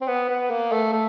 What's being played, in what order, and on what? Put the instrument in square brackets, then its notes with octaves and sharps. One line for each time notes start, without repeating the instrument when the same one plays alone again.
[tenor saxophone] C4
B3
B3
A#3
A3
A3